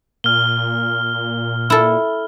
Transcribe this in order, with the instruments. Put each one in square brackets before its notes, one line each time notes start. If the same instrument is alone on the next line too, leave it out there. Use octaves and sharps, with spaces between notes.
[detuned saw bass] A#2 [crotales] F6 G7
[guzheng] E4 A4